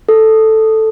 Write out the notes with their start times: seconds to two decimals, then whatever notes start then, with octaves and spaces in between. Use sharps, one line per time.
0.09 A4